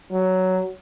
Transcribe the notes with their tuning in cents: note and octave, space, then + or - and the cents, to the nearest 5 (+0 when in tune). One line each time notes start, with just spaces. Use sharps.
F#3 +10